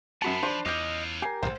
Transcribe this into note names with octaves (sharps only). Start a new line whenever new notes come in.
F#2 B3 F#4 C5 A5 B5 C#7
F3 D4 C5 C6
E2 C#4 F4 D#5 D6 G6
G4 A#4 G#5 G#6 C7
D1 G#1 C5